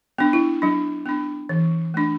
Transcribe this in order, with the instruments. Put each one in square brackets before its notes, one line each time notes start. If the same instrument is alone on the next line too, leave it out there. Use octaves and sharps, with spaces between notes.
[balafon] B3 D4
E4
F#3 D4
B3 D4
E3
A3 D4